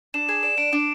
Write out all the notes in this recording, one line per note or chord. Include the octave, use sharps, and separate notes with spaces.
D4 E7
G#4 E7
D5 E7
D4 D7
D4